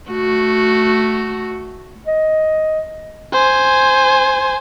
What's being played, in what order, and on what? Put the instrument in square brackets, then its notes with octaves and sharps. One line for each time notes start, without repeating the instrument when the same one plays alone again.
[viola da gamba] A3 F#4
[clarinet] D#5
[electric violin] C5 G#5